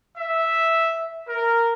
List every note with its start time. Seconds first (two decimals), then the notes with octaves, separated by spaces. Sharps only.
0.17 E5
1.28 A#4